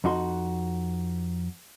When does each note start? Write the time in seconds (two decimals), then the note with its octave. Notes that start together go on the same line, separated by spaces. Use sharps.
0.04 F2 D#4 F#4 C6